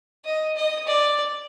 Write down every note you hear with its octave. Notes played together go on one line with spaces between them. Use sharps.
D#5
D#5
D5